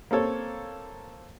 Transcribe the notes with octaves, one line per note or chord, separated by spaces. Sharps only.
A#3 C4 A4 C#5